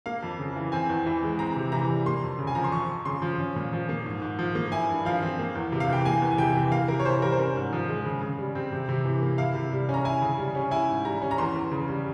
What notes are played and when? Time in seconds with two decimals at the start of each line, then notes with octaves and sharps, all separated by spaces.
0.06 A#3 F5
0.23 F2
0.39 C#3
0.56 E3
0.72 C4 G#5
0.90 E2
1.06 E3
1.23 G#3
1.39 C4 A#5
1.56 C3
1.72 E3 A#5
1.90 G3
2.06 A#3 C6
2.23 F2
2.39 C#3
2.47 G#5
2.55 F3 A#5
2.64 C6
2.72 F2 C#6
2.88 F2
3.05 C#3 C6
3.22 F3
3.39 C#4
3.56 A#2
3.73 F3
3.89 A#3
4.06 G#2
4.22 G#2
4.39 F3
4.55 A#3
4.72 E4 G#5
4.89 G2
5.05 F3 F5
5.23 C4
5.39 A#3
5.55 E2
5.72 C3
5.80 F5
5.89 E3 G5
6.05 A#3 G#5
6.22 E2
6.31 G#5
6.38 C3 G5
6.56 E3
6.72 A#3 F5
6.88 C3 A#4
6.99 C#5
7.05 E3 C5
7.22 G3 A#4
7.32 C5
7.39 C#4 A#4
7.56 G#2
7.73 F3
7.88 G#3
8.06 C#3
8.22 C#3
8.38 G3
8.55 C4
8.72 C3
8.89 C3
9.05 E3
9.22 A#3
9.38 E4 F5
9.55 C3
9.72 G3
9.89 C#4
9.94 A#5
10.05 E4 G#5
10.22 C#3
10.38 G3
10.55 C#4
10.71 E4 G#5
10.88 G#2
11.05 G3 A#5
11.22 C#4
11.31 A#5
11.38 E2 C6
11.56 E2
11.72 C#3
11.88 G3